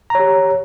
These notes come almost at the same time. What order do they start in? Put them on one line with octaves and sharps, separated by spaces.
A#5 C#5 G4